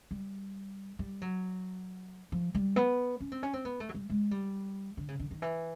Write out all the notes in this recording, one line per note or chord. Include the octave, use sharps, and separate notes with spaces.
G3
G3
F#3
F3
G3
B3
C#4
C4
C#4
C4
B3
A3
F#3
G3
G#3
G3
D3
C#3
D3
D#3
E3